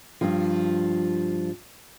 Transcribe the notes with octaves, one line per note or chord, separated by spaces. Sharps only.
G2 F3